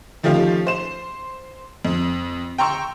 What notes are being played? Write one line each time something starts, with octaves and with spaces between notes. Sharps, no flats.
D#3 F3 A3 C#4 F4 G4
C5 E7
F2
G5 A#5 C6 C#6 E6